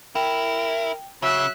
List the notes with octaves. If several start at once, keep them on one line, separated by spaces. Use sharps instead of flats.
E4 A#4 G5
C#3 F#3 E5 F#6